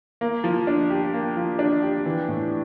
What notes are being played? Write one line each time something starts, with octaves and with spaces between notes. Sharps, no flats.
A#3
F3
D4
G4
A#3
F3
D4
G4
E3
A2